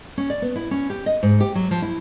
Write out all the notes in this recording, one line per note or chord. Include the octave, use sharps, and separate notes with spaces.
C#4
D5
B3
E4
C#4
G4
D#5
G#2
G4
F#3
F3
E4